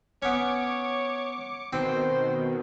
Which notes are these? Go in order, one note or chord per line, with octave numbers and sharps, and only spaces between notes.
B3 C#4 C#5 D6 C#7
B2 D#3 C4 C5